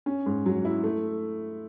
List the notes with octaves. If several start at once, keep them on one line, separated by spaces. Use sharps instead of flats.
C#4
G#2
F#3
E4
A3